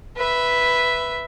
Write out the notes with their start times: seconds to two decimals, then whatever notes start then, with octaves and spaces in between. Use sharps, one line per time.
0.17 B4 E5